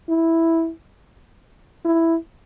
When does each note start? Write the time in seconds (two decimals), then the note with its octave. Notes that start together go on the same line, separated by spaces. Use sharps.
0.09 E4
1.85 E4